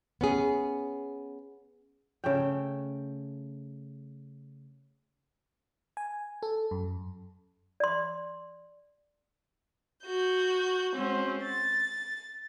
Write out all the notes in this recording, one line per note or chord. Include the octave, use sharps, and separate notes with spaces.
B3 C#4 G#4
C#3 A3 G5
G#5
A4
F#2
D5 C6
F#4 G6
G#3 C4 C#4 F#4
A6